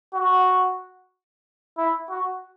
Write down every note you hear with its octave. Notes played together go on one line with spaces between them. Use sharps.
F#4
E4
F#4